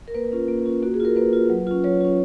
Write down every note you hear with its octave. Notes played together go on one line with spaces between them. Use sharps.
A#4
A#3 B4
C#4 F4
A#3
C#4 F4
A#3 F#4
G#4
F4 A#4
A#3 B4
F4
F#3
C#4 F4
F#3 C#5
C#4 F4